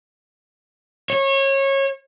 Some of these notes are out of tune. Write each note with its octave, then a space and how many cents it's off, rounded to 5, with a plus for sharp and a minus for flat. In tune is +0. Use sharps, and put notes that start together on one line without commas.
C#5 -25